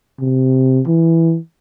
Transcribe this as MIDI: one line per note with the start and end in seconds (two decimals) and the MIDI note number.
0.20 0.82 48
0.87 1.38 52